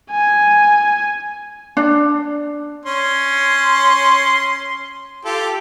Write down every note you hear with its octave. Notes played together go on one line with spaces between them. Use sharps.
G#5
D4
C#4 C6
F4 G4 A4